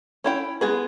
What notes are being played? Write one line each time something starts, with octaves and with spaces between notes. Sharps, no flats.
C#4 E4 G5
G#3 B3 G#4 B4